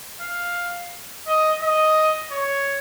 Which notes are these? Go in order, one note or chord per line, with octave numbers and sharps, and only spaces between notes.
F5
D#5
D#5
C#5